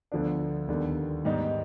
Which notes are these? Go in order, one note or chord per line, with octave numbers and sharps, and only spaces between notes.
D2 D3 F3 B3 D4
D#2 D3 G3 B3
G#2 G3 B3 D#4